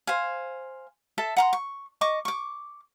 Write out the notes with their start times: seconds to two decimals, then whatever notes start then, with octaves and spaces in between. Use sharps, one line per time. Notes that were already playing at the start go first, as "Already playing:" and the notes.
0.07 C5 F5 G#5
1.18 A4 E5 A5
1.37 F#5 A#5 C6
1.53 C#6
2.01 D#5 C#6 D6
2.25 C#6 D6